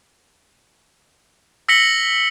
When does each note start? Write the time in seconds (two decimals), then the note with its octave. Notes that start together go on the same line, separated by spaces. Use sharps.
1.68 E6 A#6 B6 C#7 F#7 G7